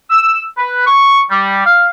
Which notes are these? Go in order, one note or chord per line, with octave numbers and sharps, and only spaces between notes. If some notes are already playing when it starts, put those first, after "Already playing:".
E6
B4
C#6
G3
F5